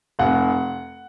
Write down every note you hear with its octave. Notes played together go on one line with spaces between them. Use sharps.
F1 F#5